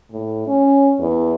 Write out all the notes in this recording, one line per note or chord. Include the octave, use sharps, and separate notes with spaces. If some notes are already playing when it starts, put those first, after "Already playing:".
A2
C#4
E2